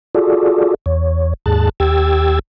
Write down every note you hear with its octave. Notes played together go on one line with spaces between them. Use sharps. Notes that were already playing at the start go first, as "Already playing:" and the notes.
F4 F#4 G#4 A4 D5
E2 C#5
D#2 G#2 G#4 A5 F#6 A6
D#2 G4 G5 E6 G#6 A6